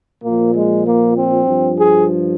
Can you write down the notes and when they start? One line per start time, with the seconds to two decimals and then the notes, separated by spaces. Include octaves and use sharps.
0.24 A#2 F3 A#3
0.55 G#3
0.86 A#3
1.16 C4
1.47 G2 F3
1.78 G#4